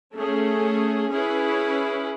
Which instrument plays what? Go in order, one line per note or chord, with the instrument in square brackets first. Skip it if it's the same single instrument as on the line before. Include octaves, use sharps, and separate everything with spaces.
[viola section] A3 C#4 G#4
C#4 E4 G#4 B4